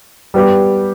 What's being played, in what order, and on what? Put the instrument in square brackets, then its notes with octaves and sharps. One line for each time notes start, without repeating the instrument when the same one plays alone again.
[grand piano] G3 B3 G4